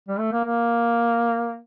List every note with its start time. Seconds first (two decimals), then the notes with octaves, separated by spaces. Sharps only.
0.08 G3
0.19 A3
0.32 A#3
0.45 A#3